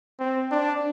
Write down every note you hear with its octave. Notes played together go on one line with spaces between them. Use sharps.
C4
D4